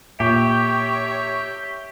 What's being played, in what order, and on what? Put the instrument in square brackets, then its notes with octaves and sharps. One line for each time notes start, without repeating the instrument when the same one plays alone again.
[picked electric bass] A#2 [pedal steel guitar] G4 [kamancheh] C#5 [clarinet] E5